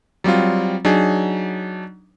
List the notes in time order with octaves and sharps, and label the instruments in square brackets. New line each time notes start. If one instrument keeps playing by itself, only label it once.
[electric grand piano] F#3 G3 C4 F4
F#3 D4 D#4 G#4